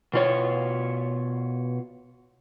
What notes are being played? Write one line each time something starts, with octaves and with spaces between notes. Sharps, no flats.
B2 F4 C#5